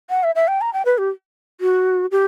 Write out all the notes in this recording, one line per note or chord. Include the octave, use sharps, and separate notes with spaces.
F#5
E5
E5
G5
A#5
G5
B4
G4
F#4
G4